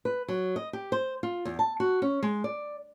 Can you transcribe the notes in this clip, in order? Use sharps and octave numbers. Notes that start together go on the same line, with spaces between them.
B4
F#3
D#5
G4
C5
F4
E2
A5
F#4
C#4
G#3
D5